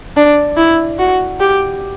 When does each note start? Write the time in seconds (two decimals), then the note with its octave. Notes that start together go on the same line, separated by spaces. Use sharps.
0.16 D4
0.57 E4
0.99 F#4
1.40 G4